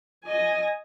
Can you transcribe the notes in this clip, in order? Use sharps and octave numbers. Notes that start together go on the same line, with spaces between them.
D#5 G#5